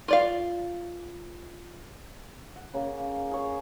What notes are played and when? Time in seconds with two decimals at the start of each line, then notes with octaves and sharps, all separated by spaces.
0.08 F4 D5 F5
2.56 F#5
2.74 C#3 A#3
3.31 G#4 C#5